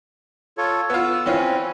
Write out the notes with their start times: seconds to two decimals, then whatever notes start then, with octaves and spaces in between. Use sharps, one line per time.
0.58 F4 A4 C#5
0.90 B3 F4 E6
1.26 E3 C4 C#4 F4